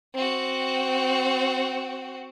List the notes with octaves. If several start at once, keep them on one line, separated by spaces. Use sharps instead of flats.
C4 F#4